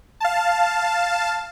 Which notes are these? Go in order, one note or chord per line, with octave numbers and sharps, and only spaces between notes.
F5 A5